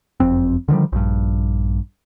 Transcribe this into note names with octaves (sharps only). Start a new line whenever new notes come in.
F#1 F2 C4
D3 D#3 F3 G3
A#1 G2